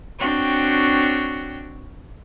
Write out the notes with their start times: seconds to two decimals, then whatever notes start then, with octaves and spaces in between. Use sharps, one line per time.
0.19 C4 D4 F#4 C#5 G5